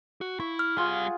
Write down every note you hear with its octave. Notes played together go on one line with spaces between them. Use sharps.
F#4
E4 C#6
F6
G3 F4 G#4 F#5 C6